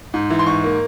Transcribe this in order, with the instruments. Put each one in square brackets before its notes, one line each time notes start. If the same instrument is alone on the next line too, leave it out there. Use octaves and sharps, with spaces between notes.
[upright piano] G#2
E3
C6
G#2 C#6
A#3